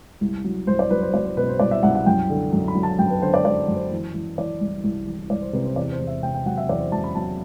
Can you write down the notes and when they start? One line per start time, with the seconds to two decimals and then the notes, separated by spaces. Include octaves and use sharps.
0.21 C2
0.44 F#3
0.67 C2 C5
0.79 D5
0.90 F#3 B4
1.02 C5
1.14 F#3 D5
1.25 C5
1.37 B2 B4
1.48 C5
1.59 C2 D5
1.71 E5
1.83 C2 F#5
1.95 F#5
2.06 F#2 G5
2.30 D3
2.53 F#2
2.68 B5
2.75 F#3
2.83 A5
2.99 F#2 G5
3.10 B4
3.22 D3 C5
3.34 D5
3.45 F#3 D5
3.68 F#2
3.76 C5
3.91 E3
4.14 E3
4.38 E3 D5
4.61 C2
4.84 C2
5.07 E3
5.30 C2 D5
5.42 C5
5.53 C3 B4
5.65 C5
5.76 E2 D5
5.92 C5
5.99 E2
6.07 E5
6.23 C3 G5
6.34 G5
6.46 F#3 F#5
6.57 E5
6.69 E2 D5
6.80 C5
6.92 F#3 A5
7.04 B5
7.15 F#3 A5